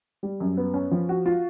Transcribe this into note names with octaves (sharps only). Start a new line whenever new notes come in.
G3
F#2
B3
C#4
F3
F#4
F4